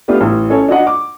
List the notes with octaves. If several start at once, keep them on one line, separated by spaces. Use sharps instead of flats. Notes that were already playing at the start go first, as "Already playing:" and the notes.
A3 B3 D4 F4 G4
A1
C#4 A4 C#5
D4 F#4 D#5 F#5
D6